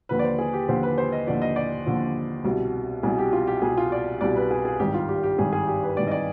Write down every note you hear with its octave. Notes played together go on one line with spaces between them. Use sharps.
D#2 D3 F3 B4
D5
C5
G#4
G4
D#2 D3 F3 C5
B4
C5
D#5
D#2 D3 F3 D5
D#5
D5
D#2 D3 F3
C2 B2 G3
C2 B2 G3 G#4
G4
F4
G4
C2 B2 G3 G#4
F4
D5
C2 B2 G3 D5
B4
G#4
G#4
G#1 G2 D#3 G3 G4
F4
G4
G4
G#1 G2 D#3 G3 G#4
G#4
G4
B4
G#1 G2 D#3 G3 D5
D#5
D5